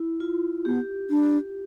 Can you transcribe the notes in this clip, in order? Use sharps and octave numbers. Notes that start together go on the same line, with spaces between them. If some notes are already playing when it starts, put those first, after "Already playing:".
Already playing: E4
F4
B3 G4
D4